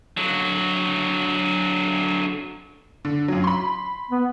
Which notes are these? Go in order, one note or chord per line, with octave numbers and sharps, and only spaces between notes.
D3 F#3
D3
F#2 F#3
B5 C6
B3